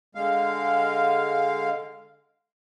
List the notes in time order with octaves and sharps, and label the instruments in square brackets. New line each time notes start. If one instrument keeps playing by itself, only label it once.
[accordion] D3 G#3 F5